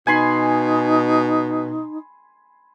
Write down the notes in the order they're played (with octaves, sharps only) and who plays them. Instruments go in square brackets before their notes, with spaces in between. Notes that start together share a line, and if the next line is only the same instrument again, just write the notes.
[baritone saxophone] B2 [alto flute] D#4 [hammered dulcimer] G#5 B5 C6